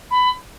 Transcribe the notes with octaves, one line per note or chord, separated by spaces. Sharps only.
B5